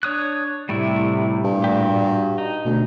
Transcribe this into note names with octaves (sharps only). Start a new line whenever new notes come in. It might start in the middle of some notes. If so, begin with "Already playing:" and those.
D4 C#5 D#6 F#6
A2 C3 G3 A3 E4
G2 A#2
F#4 G4
D#4
D2 B2